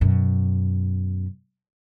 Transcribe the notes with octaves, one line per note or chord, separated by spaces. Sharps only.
F#2 B2